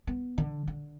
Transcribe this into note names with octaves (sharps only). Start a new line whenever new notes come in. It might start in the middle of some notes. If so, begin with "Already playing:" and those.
B3
D3
D3